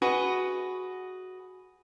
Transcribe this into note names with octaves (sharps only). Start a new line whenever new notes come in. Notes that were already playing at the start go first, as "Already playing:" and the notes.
F#4 G#4 B4 D#5